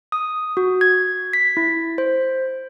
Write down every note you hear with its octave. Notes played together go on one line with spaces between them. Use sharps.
D#6
F#4
G#6
B6
E4
C5